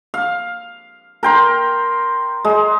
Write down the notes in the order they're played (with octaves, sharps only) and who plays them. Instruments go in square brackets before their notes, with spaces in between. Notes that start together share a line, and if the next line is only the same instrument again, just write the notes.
[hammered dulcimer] F5
A#4 G5 C6
G#3